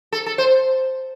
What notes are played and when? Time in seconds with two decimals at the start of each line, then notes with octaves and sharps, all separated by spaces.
0.12 A4
0.26 A4
0.38 C5